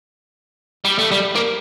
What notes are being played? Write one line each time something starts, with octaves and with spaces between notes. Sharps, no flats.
G3
A3
G3
A#3